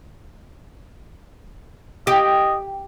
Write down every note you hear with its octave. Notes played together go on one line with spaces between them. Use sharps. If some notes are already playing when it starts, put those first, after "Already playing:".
G4 D#5